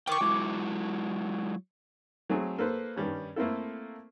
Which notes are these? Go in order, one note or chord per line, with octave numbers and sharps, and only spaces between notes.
A#4 G5 C#6 D6
F#3 G#3 E4
F#3 A3 C4 G#4 A4
A#3 A4 B4 C5
G2 D#3 G3 C#4
A3 A#3 C4 E4 A4